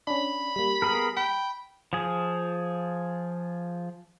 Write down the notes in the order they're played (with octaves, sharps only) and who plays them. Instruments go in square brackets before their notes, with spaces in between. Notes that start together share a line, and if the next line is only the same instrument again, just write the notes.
[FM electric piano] C#4 D4 [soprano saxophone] B5
[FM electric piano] G3 A#3
[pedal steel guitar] B3 G#4 A#4
[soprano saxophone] G5 [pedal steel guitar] B5
[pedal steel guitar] F3 G#4